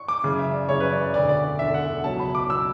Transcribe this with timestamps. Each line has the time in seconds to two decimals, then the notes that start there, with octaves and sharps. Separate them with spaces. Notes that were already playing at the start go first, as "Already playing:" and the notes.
Already playing: C#6
0.08 D6
0.24 F#2 C#3 E3
0.39 E5
0.53 D5
0.68 F#2 C#3 E3 C#5
0.80 B4
0.91 D5
1.03 D5
1.14 E1 D2 D3 D5
1.29 D5
1.44 D5
1.59 E1 D2 D3 E5
1.74 F#5
2.04 C#2 B2 F#3 C#4 A5
2.20 B5
2.35 D6
2.49 B2 F#3 C#4 E6